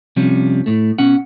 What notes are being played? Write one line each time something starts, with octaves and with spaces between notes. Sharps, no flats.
C3 F3 G3 C#4
A2 A3
B2 C#4 F#5